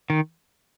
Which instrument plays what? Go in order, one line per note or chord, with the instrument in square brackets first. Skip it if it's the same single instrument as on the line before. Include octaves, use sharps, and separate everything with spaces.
[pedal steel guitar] D#3